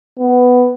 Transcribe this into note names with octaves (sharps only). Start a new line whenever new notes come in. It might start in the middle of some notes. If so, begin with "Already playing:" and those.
B3